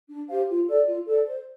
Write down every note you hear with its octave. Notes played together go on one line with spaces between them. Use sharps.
D4
G4 C5 F5
F4
A4 D5
F4
A4 D5
C5